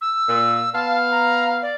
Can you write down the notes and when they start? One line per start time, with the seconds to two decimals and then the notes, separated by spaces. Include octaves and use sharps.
0.01 E6
0.28 A#2
0.74 B3 F5 A5
1.12 A#5
1.62 D5